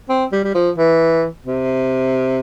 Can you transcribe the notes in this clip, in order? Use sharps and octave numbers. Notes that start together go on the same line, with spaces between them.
C4
G3
G3
F3
E3
C3